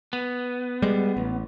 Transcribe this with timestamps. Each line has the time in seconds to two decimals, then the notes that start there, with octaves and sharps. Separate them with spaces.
0.13 B3
0.82 G3 G#3
1.17 A1